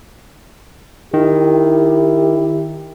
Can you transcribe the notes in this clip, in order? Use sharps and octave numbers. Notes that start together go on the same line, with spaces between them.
D#3 E4 G4